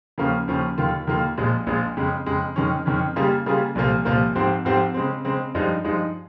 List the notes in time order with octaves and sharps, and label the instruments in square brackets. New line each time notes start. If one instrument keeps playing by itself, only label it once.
[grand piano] D#2 C#3 F3 A#3 C#4
D#2 C#3 F3 A#3 C#4
D#2 D#3 A#3 F4
D#2 D#3 A#3 F4
A#1 A#2 F3 G#3
A#1 A#2 F3 G#3
F2 C#3 G#3
F2 C#3 G#3
F2 D#3 G#3 C#4
F2 D#3 G#3 C#4
C#3 G3 A#3 F4 G#4
C#3 G3 A#3 F4 G#4
C2 A#2 F3 A#3
C2 A#2 F3 A#3
G#2 F3 C4 G4 C5
G#2 F3 C4 G4 C5
C#3 G#3 C4
C#3 G#3 C4
G2 F3 G#3 D#4
G2 F3 G#3 D#4